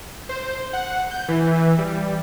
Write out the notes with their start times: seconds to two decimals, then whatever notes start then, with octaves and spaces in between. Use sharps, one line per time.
0.29 C5
0.73 F#5
1.11 G6
1.28 E3
1.78 G3